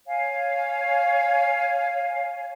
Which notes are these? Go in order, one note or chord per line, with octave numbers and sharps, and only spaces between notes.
C#5 F5 G#5